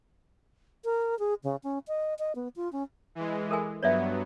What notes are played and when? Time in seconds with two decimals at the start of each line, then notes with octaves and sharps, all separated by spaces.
0.85 A#4
1.19 G#4
1.43 C#3
1.63 C#4
1.88 D#5
2.19 D#5
2.35 B3
2.56 F4
2.72 C#4
3.15 E3 G#3
3.51 A4 A#4 G#5
3.83 G2 F#3 B3 C#5 D5 E5